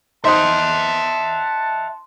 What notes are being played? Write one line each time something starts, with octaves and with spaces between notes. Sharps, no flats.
D#4 C5 E5 F#5 A5 C6 D#6